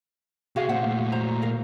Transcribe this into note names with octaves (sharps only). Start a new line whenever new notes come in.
C3 F#4 G#4 F5 G5
A#2 A3 C5 F#5
F#4 C5 A#5
A#4 F5